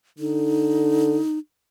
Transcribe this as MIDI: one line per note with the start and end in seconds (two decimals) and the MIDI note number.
0.19 1.19 50
0.19 1.38 63